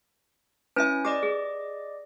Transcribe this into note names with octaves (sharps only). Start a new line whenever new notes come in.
C#4 E4 B4 E5 G#5
G4 D5 D#5 D6
G#4